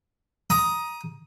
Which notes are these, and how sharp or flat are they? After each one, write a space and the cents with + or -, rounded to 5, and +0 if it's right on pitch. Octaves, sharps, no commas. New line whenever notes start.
A#5 +25 D#6 +5